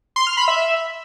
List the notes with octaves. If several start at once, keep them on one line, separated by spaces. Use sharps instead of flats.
C6
F6
B5
E5